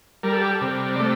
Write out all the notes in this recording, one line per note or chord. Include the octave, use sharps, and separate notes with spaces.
G3 A#4
A4
G4
A4
C3
D5
A3